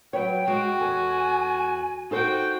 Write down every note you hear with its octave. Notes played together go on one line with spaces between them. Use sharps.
F#3 B4 C#5 G5
G#3 F#4
E2 A4 G#5
D#4 F#4 A4 C5 G5